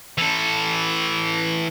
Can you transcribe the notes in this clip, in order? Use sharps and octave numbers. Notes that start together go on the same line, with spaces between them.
E3 A4